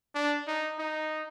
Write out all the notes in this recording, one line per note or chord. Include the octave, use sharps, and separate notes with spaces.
D4
D#4
D#4